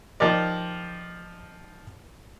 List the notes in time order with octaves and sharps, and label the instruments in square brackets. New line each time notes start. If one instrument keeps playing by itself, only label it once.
[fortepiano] F3 D#4 G4 A#4 D5